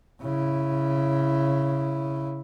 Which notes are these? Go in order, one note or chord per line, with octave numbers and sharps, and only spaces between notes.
C#3 E4